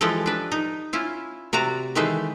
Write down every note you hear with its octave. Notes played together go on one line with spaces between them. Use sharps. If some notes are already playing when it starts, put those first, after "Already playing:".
E3 F3 G#3 G4 A4
D4 B4
D#4
C#4 E4 F4
C3 F#4 D5 A#5
D#3 E3 G#3 A3 B4 C5